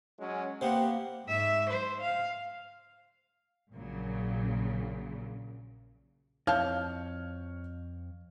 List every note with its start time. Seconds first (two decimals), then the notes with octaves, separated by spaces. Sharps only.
0.19 F#3 G#3 C#4
0.61 C3 A#3 B3 G4 C5 F#5
1.27 G#2 E5
1.70 C5
2.01 F5
3.73 A#1 A#2 C#3 F#3
6.47 F2 E4 C#5 F5 A5 F6 G6